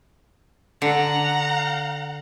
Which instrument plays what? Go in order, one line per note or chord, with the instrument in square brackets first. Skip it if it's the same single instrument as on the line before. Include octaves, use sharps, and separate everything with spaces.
[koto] D3 [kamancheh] F#5 A#5